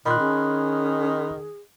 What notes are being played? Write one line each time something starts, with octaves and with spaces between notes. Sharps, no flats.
A#2 D#3 F4 B5 C6 F#6
C#4 G#4